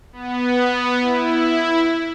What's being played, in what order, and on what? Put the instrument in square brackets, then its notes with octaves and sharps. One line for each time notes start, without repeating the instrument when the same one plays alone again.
[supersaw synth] B3
E4